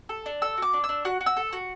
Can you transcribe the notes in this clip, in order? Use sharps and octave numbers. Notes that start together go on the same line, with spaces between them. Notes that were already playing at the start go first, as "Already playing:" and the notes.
A4
D4
A4 E6
F#4 D6
D4
E6
D4
F#4 F#6
F#4
E6
A4
F#4